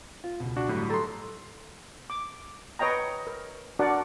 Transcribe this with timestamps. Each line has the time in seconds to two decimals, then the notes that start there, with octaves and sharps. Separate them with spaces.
0.24 F4
0.40 C#2 G#2 B2
0.56 D4 F#4 D6 F#6
0.68 G1 A2 F#3 G3
0.90 A4 A#5 C6
2.10 D6
2.79 B4 C#5 D#5 G5 A#5
3.27 A#4
3.79 D4 F#4 A#4 D5 F#5